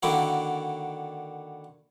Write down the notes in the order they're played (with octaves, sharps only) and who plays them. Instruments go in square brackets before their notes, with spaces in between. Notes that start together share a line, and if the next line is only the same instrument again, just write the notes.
[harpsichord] D3 D#3 A#3 D4 E4 F#4